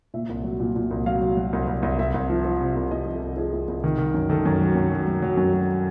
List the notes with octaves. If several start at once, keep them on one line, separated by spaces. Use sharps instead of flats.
A#2 E5
C2
F#3
A#2
A#2
C2
F#3 F5
F#3
F#3
C2
C2
C2
C2 E5
C2
F3
F3
C3
C2
C2 D#5
F3
A4
C2
F3 G#4
C2
C2
D#3
D#3
F#2
D#3 A4
F#2
F#3
F#2
F#3
F#3
F#3
F#2
F#3